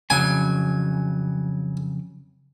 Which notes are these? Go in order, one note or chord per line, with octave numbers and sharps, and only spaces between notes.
F2 C#3 F#3 G#5